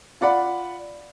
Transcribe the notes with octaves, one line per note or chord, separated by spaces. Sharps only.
F4 D5 F#5 B5